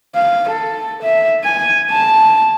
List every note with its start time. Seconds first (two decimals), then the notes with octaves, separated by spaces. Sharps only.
0.15 F5
0.49 A4
1.02 E5
1.44 G#5
1.91 A5